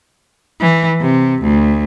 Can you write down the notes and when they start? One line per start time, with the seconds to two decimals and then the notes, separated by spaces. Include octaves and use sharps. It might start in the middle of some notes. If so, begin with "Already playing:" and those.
0.60 E3
1.01 C3
1.42 D2